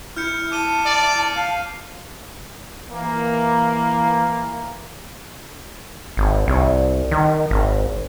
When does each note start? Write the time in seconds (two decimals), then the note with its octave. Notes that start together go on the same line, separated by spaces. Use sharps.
0.16 E4 F6 G6 C#7
0.52 A5 D6 D#7 G7
0.86 D5
1.36 F5
2.92 E3 A#3
6.17 G#1
6.48 C2
7.11 D#3
7.51 G#1